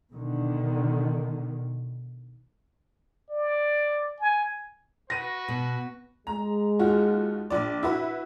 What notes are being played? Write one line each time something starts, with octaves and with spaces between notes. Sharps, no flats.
B2 D3 D#3
D5
G#5
F#4 B4 A#6 D#7
B2
G#3 A#5
D#2 F4 F#4
A#1 D5
E4 F#4 B4